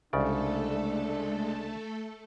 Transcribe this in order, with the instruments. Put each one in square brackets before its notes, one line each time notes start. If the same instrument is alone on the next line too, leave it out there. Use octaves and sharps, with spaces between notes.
[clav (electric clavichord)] C2 C#3 D5 [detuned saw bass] G#3 [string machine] A3 A4 [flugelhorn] D4